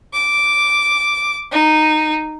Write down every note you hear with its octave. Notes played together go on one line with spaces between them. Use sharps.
D6
D#4